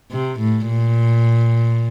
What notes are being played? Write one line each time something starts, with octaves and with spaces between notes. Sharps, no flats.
C3
A2
A#2